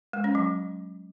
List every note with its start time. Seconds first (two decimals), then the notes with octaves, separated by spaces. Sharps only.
0.13 G#3
0.24 C#4
0.35 F#3